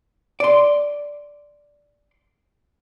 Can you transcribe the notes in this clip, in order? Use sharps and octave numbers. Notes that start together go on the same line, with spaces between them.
D5 C6